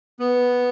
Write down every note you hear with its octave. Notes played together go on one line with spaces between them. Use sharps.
B3